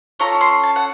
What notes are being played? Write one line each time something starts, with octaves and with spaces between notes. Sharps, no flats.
C#4 F4 A4 A#5
C6
A5
F#5